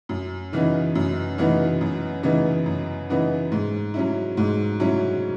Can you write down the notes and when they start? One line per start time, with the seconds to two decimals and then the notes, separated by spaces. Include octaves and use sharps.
0.09 F#2
0.52 C#3 E3 B3 D#4
0.95 F#2
1.38 C#3 E3 B3 D#4
1.81 F#2
2.23 C#3 E3 B3 D#4
2.66 F#2
3.09 C#3 E3 B3 D#4
3.52 G#2
3.94 F#3 C#4 E4
4.37 G#2
4.80 F#3 C#4 E4